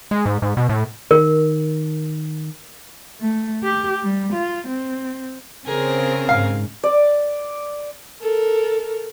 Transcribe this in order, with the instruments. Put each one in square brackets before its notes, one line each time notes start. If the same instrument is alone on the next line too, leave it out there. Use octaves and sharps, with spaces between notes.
[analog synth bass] G#3
G#2
G#2
B2
A2
[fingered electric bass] D#3 [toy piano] A#4
[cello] A3
G4
G3
F4
C4
[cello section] C#3 C4 [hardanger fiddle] G#4 A#4
[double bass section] G#2 [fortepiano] F5
[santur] D5
[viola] A4 A#4